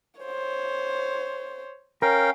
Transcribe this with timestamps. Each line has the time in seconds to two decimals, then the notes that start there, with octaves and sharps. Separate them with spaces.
0.20 C5 C#5
2.02 C#4 A#4 F5 G5